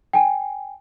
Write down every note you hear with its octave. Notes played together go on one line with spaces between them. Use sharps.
G5 G#5